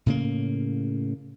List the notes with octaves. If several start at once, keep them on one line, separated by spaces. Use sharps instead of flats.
A2 C#3 A#3